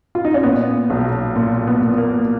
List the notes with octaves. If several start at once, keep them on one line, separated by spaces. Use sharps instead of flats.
F4
D#4
C#4
A#2 B3
B1
A#2
B3
A#2
A#3